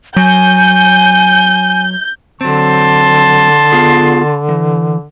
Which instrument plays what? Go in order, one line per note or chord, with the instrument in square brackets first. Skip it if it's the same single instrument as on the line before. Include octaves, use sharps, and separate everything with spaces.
[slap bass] F#3 [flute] G#5 [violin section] G6
[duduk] D3 [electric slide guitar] F#3 C4 [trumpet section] A5 C6
[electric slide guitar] B3 F4 G#4
E3